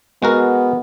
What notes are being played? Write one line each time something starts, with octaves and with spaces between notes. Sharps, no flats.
G#3 B3 F#4 A#4